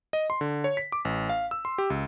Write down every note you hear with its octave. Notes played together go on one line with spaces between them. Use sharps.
D#5
C6
D3
C#5
B6
D6
A1
F5
E6
C6
G4
C#2